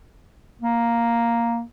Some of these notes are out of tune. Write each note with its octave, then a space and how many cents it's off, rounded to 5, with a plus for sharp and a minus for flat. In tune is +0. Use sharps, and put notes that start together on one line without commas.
A#3 +0